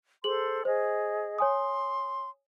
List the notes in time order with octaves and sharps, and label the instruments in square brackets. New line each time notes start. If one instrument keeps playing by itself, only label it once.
[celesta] G#4 F#7 [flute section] A4 C5 C6
[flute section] G#4 D#5 [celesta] C5
[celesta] C#5 G#5 D#6 [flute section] C6